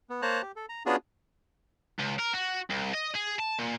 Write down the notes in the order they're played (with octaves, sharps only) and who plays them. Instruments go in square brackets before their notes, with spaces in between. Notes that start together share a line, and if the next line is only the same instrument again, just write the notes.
[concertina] B3
A#3 C5 C#5 A5 A#5 F#6
G4
A4
A#5
B3 C#4 D4 F4 F#4 G#4
[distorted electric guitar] C#2
A#4
F#4
C2
D#5
G#4
A5
A#2